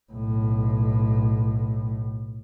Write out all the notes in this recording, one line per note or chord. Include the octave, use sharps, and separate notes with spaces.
B1 A2